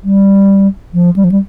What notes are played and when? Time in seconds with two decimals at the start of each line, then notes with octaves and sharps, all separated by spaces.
0.04 G3
0.94 F3
1.16 G3
1.24 F3
1.32 G3